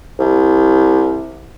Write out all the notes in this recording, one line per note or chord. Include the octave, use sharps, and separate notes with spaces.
C2